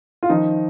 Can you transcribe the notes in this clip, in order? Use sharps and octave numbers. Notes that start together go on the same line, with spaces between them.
F4
D#3 F3 D#4